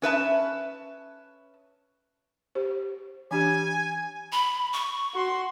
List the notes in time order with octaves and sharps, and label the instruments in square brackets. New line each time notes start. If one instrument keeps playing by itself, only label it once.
[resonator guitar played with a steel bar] C#4 B4 E5 A5
[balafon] G4 C5
[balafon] E3 D4 G4 [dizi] G#5
[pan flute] B5
C#6
[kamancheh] F#4 C6